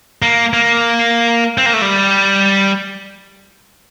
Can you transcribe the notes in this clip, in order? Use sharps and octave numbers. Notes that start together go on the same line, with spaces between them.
A#3
A#3
C4
A#3
A3
G3